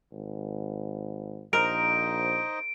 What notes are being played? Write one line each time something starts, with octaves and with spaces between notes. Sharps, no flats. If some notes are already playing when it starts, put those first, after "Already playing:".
G#1
A#1 D#4 A#4 C5 D#5 D7